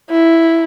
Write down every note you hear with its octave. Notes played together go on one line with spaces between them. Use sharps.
E4